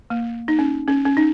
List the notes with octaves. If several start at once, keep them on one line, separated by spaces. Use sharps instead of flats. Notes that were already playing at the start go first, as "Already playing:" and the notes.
A#3
D#4
C#4
C#4
C#4
D#4